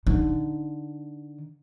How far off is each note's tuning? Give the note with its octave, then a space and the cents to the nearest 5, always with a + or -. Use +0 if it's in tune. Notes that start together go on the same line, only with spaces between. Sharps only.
D3 +0 D#4 +0